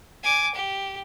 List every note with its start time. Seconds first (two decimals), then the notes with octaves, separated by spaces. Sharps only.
0.23 G#5 D6
0.55 G4